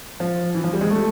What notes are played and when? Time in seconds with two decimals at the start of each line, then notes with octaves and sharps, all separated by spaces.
0.20 F3
0.55 E3
0.64 F3
0.73 G3
0.81 G#3
0.91 A3